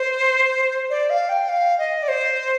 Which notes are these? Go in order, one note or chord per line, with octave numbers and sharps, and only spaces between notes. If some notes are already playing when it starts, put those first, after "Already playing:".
Already playing: C5
D5
F5
G5
F5
D#5
D5
C5